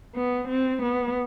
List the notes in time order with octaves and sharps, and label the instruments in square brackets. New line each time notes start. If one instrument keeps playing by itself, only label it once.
[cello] B3
C4
B3